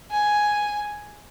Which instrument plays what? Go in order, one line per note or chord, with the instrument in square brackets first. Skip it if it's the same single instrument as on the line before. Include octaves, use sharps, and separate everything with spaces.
[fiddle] G#5